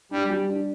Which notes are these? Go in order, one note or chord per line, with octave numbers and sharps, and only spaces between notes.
G3 D4
G3
D4